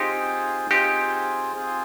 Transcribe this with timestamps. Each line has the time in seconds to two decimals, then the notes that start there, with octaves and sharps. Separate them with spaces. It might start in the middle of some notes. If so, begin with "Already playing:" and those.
Already playing: C4 D#4 F4 G4 G#4 C5
0.71 C4 D#4 F4 G4 G#4 C5
1.56 C4 F4 G#4 C5